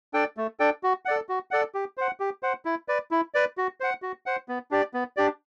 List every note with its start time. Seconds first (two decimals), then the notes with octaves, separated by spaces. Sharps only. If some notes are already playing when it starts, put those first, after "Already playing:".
0.14 D4 A4 D5 G5
0.37 A3
0.60 D4 A4 D5 G5
0.83 F#4
1.05 A4 D5 F#5
1.29 F#4
1.51 A4 D5 F#5
1.75 G4
1.97 C5 F#5
2.20 G4
2.43 C5 F#5
2.65 E4
2.88 B4 D5
3.11 E4
3.34 B4 D5
3.57 F#4
3.80 C5 F#5
4.02 F#4
4.26 C5 F#5
4.49 B3
4.71 D4 G4 D5
4.94 B3
5.17 D4 G4 D5